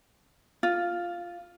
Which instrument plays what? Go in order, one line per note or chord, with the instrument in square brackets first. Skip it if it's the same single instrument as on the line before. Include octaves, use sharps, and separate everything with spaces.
[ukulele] F4